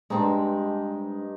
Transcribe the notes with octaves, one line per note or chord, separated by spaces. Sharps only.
G2 G#3 C4 D4 D#4